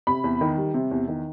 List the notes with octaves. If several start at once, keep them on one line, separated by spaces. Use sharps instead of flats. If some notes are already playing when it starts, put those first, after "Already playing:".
C3 B5
E2
D#3
G3
C3
E2
D#3